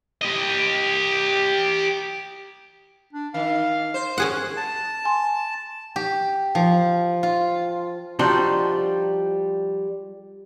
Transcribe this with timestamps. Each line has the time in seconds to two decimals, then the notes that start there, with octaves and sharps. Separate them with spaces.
0.22 G4 D#5
3.13 D4
3.34 D#3 F5
3.94 C5
4.18 C#4 G#4 F#5
4.57 A5
5.05 G#5 C6
5.96 G4
6.55 F3
7.23 F4
8.19 F3 G3 D4 D#4 F4 F#4